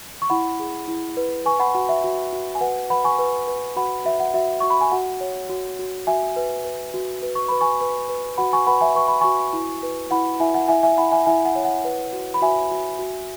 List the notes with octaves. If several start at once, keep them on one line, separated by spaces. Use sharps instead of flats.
C#6
E4 F#5 B5
G#4
E4
B4
B4 G#5 C#6
F#5 B5
F#4 F#5
E5
F#4
F#4
G#5
B4 F#5
B4 F#5 B5
G#5 C#6
B4
B4
F#4 F#5 B5
F#4 E5
F#5
F#4 E5
F#4 C#6
B5
G#5
F#4 F#5
C#5
F#4
F#4
F#4 E5 G#5
B4
B4
F#4
B4
C#6
B4 B5
G#5 C#6
B4
B4
F#4 F#5 B5
G#5 C#6
B4 F#5 B5
E5 G#5
B4 C#6
B5
F#4 G#5 C#6
E4
B4
E4 F#5 B5
E4 E5 G#5
F#5
E4 E5 G#5
E5 G#5
E4 F#5 B5
E5 G#5
E4 E5 G#5
F#5
C#5
F#5
B4
F#4
B5
F#4 E5 G#5
F#4
F#4